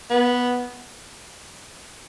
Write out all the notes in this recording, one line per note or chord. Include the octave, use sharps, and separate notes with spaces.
B3